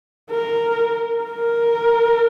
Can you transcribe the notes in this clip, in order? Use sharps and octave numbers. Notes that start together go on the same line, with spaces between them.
A#4
A#4